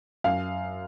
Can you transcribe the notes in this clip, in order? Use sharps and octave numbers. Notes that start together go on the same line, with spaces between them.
F#2 F5